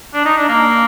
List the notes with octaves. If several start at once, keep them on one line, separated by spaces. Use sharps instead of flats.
D4
D#4
D4
A#3